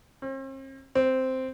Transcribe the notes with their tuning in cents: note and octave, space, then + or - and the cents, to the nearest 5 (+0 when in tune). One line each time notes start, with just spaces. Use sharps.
C4 +45
C4 -5